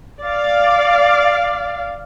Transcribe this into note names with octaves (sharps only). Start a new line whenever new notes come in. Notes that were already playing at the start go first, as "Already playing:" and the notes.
D5 F5